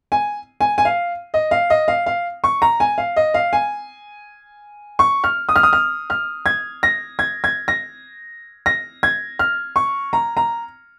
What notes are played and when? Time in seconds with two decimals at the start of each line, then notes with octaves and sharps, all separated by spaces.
0.12 G#5
0.61 G#5
0.78 G#5
0.85 F5
1.34 D#5
1.51 F5
1.70 D#5
1.88 F5
2.06 F5
2.44 C#6
2.62 A#5
2.80 G#5
2.98 F5
3.16 D#5
3.34 F5
3.53 G#5
4.99 C#6
5.24 F6
5.49 D#6
5.56 F6
5.63 D#6
5.73 F6
6.10 F6
6.46 G#6
6.83 A#6
7.19 G#6
7.44 G#6
7.68 A#6
8.66 A#6
9.03 G#6
9.39 F6
9.76 C#6
10.13 A#5
10.37 A#5